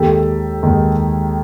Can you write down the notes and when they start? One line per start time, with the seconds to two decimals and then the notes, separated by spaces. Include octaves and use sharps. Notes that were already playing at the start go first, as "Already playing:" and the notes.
Already playing: D#2 D#3 G#3 G4 A4
0.63 D#2 D#3 G#3